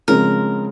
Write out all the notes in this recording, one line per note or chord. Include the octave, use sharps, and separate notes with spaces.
C#3 F3 G#3 C4 A#4